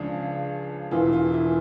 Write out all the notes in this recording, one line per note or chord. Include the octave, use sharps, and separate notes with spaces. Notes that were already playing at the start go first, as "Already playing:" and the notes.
Already playing: C#2 C#3 F3 D4
E1 E2 E3 F4
F4
E4